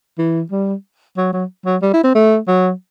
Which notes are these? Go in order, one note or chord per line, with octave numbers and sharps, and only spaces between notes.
E3
G3
F#3
F#3
F#3
G3
E4
C4
A3
F#3